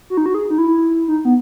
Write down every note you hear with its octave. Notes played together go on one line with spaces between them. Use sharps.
F#4
D#4
F#4
G#4
D#4
E4
D#4
B3